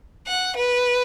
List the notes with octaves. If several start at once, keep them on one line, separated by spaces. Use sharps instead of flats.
F#5
B4